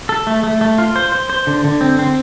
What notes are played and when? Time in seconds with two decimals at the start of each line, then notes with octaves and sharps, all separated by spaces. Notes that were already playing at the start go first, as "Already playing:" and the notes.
0.09 A4
0.27 A3
0.43 A3
0.61 A3
0.78 F4
0.96 C5
1.12 C5
1.30 C5
1.47 D3
1.64 D3
1.81 C4
1.99 C4